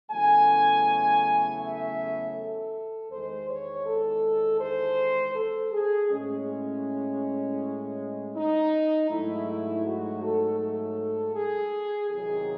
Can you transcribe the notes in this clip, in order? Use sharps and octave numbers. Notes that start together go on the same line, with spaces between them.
E2 C#3 F#3 A3 G#5
E5
A4
E2 D#3 G#3 C5
C#5
A4
C5
A4
G#4
A2 G#3 C#4
D#4
G#2 F#3 A3 E4
F#4
A4
A4
G#4
E2 C3 D#3 F#3 G#4